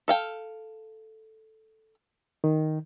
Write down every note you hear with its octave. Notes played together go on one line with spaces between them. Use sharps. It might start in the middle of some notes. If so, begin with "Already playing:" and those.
A4 F5 G5
D#3